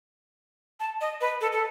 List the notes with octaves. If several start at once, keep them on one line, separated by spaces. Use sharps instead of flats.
A5
D#5
B4
A4
A4